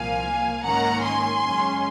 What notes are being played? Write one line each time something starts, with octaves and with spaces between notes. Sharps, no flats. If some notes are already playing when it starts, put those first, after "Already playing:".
Already playing: C2 A#2 F3 A#3 F5 G#5
G#2 D#3 A#3 C#4 F#5 A#5
G#5 C6
F#2 C#3 G#3 C#4